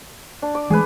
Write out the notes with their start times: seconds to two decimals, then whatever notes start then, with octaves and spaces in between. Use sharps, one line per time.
0.42 D4
0.55 D5
0.70 E3 G#3 A3 G#4 B4